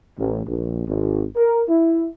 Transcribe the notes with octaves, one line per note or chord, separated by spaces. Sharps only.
A1
A#1
G#1
A#4
E4